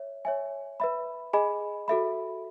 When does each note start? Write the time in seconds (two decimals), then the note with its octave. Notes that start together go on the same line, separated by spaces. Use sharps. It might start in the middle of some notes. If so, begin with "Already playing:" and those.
Already playing: C#5 E5
0.25 C#5 E5 G#5
0.80 B4 E5 B5
1.33 G#4 D#5 G#5 B5
1.88 F#4 A4 E5 B5